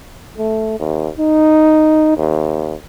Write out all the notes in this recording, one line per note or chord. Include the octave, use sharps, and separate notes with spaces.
A3
D#2
D#4
D#2